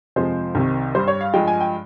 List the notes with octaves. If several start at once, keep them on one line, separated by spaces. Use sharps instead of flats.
F2 C3 F3 G#3 C5
C2 C3 D#3
G2 G3 C5
C#5
F5
G2 F3 G#3 G5
G#5
G5